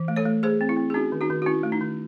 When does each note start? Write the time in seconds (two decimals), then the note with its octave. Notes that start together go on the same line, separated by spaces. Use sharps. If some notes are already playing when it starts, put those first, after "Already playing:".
Already playing: E3
0.08 A3
0.16 A4 C#5
0.25 A3
0.43 A3 G#4 C5
0.61 C4
0.69 E4
0.77 C4
0.90 G#4
0.94 C#4 D#4 F#4
1.12 D#3
1.21 D#4 F#4
1.30 D#3
1.42 F#4
1.46 C#4 E4
1.63 A3
1.72 D#4
1.81 D#3